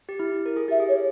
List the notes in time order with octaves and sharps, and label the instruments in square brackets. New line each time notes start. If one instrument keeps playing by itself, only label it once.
[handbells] G4
E4
A#4
G#4
[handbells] G4 [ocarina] E5
[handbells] G#4
[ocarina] C#5